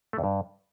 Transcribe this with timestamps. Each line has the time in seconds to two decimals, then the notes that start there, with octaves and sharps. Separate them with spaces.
0.13 A3
0.18 E2
0.24 G2